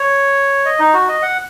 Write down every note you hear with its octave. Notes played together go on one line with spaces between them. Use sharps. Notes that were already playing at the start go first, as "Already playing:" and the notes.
Already playing: C#5
D#5
D#4
F#4
D#5
F#5